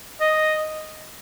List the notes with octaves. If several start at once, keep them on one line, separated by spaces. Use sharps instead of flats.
D#5